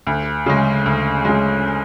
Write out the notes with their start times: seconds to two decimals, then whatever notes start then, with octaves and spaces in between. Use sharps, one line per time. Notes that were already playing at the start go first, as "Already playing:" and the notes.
0.07 D2
0.46 C#3 G#3
0.86 D2
1.25 C#3 G#3